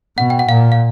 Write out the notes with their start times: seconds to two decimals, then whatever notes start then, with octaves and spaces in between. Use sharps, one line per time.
0.17 B2 F#5
0.30 G5
0.39 F#5
0.49 A#2 F5
0.72 F5